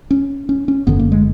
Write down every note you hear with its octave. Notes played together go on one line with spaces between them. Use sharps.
C#4
C#4
C#4
F#1 F#2 D3 B3
A#3
G#3